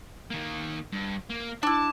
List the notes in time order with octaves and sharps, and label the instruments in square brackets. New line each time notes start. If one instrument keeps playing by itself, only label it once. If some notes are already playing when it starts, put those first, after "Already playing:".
[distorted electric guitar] D#3 A#3
G2
A#3
[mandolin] D4 E4 [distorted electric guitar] A5